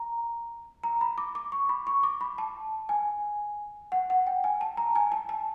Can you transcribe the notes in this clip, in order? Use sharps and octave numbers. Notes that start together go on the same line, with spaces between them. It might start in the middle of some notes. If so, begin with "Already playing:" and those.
Already playing: A#5
A#5
B5
D6
D6
C#6
B5
C#6
D6
B5
A5
G#5
F#5
F#5
G5
G#5
A5
A#5
G#5
A5
A5